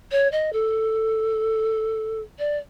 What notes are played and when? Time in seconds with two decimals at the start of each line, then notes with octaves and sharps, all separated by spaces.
0.11 C#5
0.31 D#5
0.53 A4
2.39 D5